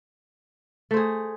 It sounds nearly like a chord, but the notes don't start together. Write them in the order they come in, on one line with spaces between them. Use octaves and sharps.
A3 C5 G#4